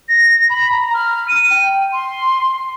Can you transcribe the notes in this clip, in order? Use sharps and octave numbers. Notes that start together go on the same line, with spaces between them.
A#6
B5
A#5
F6
D#7
G5
C6